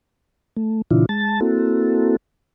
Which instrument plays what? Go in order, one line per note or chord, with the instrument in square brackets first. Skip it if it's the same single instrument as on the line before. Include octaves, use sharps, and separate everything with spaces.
[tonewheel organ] A3
A#2 C#3 E3 D4 E4 F4
G#3 A5 A6
A#3 C4 E4 F#4 A4